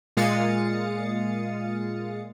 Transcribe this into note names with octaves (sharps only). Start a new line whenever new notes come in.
A#2 G#3 F5 D#6 A6 C#7